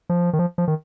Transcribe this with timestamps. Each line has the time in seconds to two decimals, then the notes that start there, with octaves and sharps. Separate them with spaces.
0.09 F3
0.33 D#3
0.39 F3
0.58 F3
0.68 D#3